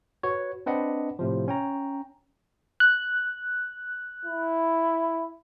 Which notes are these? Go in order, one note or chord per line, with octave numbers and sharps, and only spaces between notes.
F#4 B4 C#5
C4 D4 B4 D#5 F#5
A2 C3 F3
C#4 G5 A#5
F#6
E4